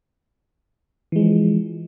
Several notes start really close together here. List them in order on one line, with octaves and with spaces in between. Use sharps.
E3 G#3 F3